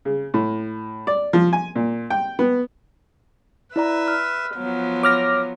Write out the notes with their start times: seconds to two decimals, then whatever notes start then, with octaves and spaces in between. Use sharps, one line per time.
0.05 C#3
0.34 A2
1.07 D5
1.33 F3
1.53 G#5
1.75 A#2
2.10 G5
2.39 B3
3.76 E4 B4 D5 E5 A#5
4.08 F6
4.55 F3 F#3 B3
5.03 C#5 D6 F6 A#6